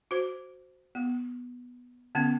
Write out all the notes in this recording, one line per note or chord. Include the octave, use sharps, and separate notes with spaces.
F#4 C5
B3
D3 B3 C#4